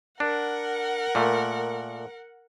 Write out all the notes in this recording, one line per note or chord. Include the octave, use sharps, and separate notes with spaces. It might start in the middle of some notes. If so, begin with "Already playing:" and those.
D4 A#4 F#5
A#2 A3